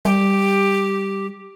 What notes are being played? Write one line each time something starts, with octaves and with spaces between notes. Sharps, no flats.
G3 G4